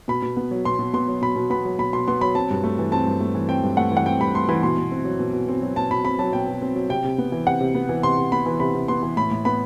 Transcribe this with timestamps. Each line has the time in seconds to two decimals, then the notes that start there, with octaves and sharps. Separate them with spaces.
0.08 B2 B5
0.22 B2
0.37 B3
0.51 F#3
0.65 B2 C6
0.79 B2
0.93 B3 C6
1.08 F#3
1.22 B2 B5
1.36 B2
1.50 B3 B5
1.65 F#3
1.79 B2 B5
1.93 B2 C6
2.08 B3 C6
2.21 F#3 B5
2.35 C4 A5
2.50 G2
2.64 A3
2.79 E3
2.92 C4 A5
3.07 G2
3.21 A3
3.35 E3
3.49 C4 G5
3.63 G2
3.77 A3 F#5
3.91 E3
3.97 F#5
4.06 C4 G5
4.20 G2 B5
4.35 A3 C6
4.49 E3 B5
4.63 B2 C6
4.77 B2
4.91 C4
5.05 F#3
5.19 B2
5.33 B2
5.49 C4
5.62 F#3
5.76 B2 A5
5.90 B2 B5
6.05 C4 B5
6.19 F#3 A5
6.33 B2 G5
6.48 B2
6.62 C4
6.76 F#3
6.89 C3 G5
7.04 C3
7.18 B3
7.32 E3
7.47 C3 F#5
7.61 C3
7.75 B3
7.89 E3
8.03 C3 C6
8.18 C3
8.32 B3 B5
8.46 E3
8.60 C3 B5
8.75 C3
8.88 B3 C6
9.03 E3
9.17 A2 B5
9.31 A2
9.45 B3 B5